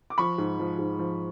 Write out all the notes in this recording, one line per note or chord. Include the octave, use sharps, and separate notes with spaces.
D6
F3 B5 C#6
G#2
F3
G#2
F3